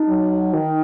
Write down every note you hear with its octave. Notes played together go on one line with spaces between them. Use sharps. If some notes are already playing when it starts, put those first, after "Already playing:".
Already playing: D#4
F#3
D#3